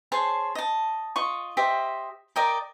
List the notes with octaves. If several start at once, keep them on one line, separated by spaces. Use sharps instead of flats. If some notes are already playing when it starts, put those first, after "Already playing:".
G#4 C5 C#5 A5
D#5 A5
F4 D#5 C#6
G4 C5 D#5 E5
A#4 D5 D#5 G5